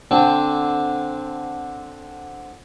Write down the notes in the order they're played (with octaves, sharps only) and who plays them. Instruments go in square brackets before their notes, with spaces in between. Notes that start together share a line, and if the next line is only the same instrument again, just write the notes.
[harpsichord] D3 C4 D4